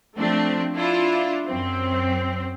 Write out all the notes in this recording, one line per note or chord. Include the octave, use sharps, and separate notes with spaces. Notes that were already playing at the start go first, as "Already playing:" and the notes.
F3 A3 C4 D4
D4 E4 F4
F#2 C4